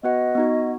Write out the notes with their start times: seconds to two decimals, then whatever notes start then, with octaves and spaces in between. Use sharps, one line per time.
0.03 B3 F#4 B4 D#5 F#5
0.35 B3 D#4 F#4